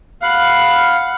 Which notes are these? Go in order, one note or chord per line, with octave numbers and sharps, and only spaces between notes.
F5 F#5 B5